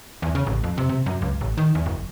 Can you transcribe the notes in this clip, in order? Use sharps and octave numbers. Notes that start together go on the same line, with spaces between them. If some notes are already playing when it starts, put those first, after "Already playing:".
E2
C#3
A1
F2
C3
C3
F#2
C#2
A1
D#3
E2
F#1